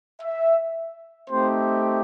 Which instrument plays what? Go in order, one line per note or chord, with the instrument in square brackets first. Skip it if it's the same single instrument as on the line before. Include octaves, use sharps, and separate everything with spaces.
[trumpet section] E5
A3 C4 D#4 G4 C5